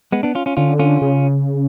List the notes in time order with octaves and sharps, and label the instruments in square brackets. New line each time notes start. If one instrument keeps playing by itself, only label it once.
[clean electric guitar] G#3 B3
B3 D4
C#4 F4
C#4 F4
[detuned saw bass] D3 [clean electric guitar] C#4 F4
[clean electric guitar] C#4 F4
[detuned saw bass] C#3